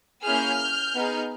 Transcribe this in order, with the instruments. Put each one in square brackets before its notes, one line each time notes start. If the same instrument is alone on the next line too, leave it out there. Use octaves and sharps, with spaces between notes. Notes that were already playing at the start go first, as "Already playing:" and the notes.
[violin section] A#3 C#4 E4 G#4 F6 G6
B3 D#4 G#4